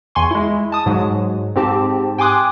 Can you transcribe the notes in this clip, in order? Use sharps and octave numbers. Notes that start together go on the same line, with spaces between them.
E2 G#5 C6 C#6
G#3 E4
A5 D#6
G#2 F#3 G#3
G#2 C4 G4 A5
G5 G#5 C6 D6 D#6 F#6